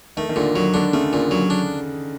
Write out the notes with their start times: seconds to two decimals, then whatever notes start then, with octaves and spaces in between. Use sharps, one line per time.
0.17 D#3 A3
0.29 D#3
0.36 A#2 D3
0.55 D#3 F#3
0.74 D3 D4
0.93 C#3 A3
1.13 A#2
1.31 F#3
1.50 D4